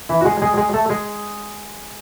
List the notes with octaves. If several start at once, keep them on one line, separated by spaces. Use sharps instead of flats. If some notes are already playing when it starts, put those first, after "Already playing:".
E3 E4
F#4
G#3 G#4
G#3 G#4
G#3 G#4
A3 A4
G#3 G#4